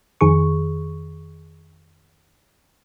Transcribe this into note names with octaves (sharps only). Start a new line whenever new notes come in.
F2 D#3 G#4 C#6